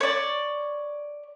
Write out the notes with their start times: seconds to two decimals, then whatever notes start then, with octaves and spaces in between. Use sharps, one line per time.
0.01 C#5 D5